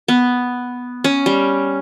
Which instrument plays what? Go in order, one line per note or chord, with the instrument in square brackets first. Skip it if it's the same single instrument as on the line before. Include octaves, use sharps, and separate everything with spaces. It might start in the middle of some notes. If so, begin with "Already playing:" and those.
[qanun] B3
C#4
G3